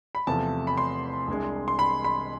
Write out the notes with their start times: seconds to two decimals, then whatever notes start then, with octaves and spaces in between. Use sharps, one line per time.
0.15 B5
0.27 E2 C3 F3 A3 A5
0.67 B5
0.78 C6
1.28 C2 C3 G#3 D4
1.68 C6
1.79 B5
2.04 B5